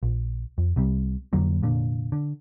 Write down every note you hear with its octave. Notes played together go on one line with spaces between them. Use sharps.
A#1
F2
C2 C3 G3
F2 D3 F#3 A#3
F1 A#2 D3
D3